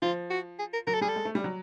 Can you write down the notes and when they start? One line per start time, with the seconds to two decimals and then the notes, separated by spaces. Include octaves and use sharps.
0.02 F3 F4
0.30 F#4
0.59 G#4
0.73 A#4
0.87 F#3 A#4
0.94 A4
1.01 G3 G#4
1.08 A4
1.16 G#3
1.25 A3
1.35 G3
1.44 F#3